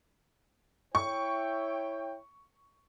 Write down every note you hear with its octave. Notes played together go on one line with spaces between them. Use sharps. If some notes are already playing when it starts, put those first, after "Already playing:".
E4 C#5 G5 C#6